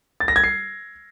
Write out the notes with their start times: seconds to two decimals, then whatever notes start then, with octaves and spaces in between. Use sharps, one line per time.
0.20 A6
0.28 A#6
0.36 G#6
0.44 C7